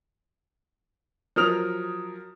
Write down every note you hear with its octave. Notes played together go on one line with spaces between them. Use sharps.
F3 F#3 A#4 D#6 F6 F7